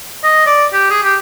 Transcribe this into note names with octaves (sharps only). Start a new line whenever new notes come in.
D#5
D5
G4
G#4
G4